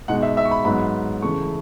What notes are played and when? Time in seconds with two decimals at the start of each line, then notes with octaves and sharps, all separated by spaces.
0.08 B2 G#3 D#4 F#5
0.22 E5
0.37 E5
0.45 C#6
0.51 B5
0.65 G#2 F#3 B3 D#4 B5
1.22 C#3 E3 A3 C#6